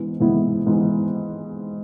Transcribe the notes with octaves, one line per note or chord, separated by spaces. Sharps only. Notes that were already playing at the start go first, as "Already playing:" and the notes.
Already playing: G#2 E3 B3 E4
G#2 E3 B3 E4
G#2 E3 B3 E4